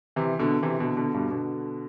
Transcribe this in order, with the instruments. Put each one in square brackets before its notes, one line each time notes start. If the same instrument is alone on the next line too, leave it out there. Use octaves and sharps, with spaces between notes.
[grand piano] C3 E3
B2 D3
C3 E3
B2 D3
B2 D3
G2 B2
B2 D3